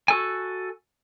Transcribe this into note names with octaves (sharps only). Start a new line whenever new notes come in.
F#4 A4 G#5